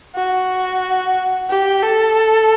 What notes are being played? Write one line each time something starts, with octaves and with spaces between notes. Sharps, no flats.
F#4
G4
A4